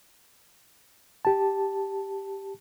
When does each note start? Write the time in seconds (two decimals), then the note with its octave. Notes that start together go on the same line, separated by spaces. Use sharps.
1.25 G4 A5